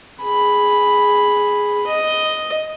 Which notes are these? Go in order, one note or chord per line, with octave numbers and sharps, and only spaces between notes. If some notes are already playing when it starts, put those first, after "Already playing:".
G#4 B5
D#5